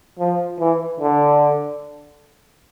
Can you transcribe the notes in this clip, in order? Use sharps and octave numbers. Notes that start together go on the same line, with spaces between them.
F3
E3
D3